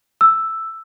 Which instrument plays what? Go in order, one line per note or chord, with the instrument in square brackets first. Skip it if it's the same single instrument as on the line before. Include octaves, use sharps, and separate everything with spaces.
[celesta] E6